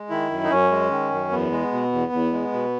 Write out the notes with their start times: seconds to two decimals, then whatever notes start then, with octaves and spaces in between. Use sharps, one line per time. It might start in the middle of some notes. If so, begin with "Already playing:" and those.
Already playing: G#3
0.10 D#3 E4
0.30 F#2
0.44 D#4
0.50 F#2 C#4
0.71 G#3
0.91 D#3
1.11 F#2
1.31 E2 B3
1.52 G#3
1.72 B2
1.92 E2
2.12 E2
2.33 G#3
2.53 B2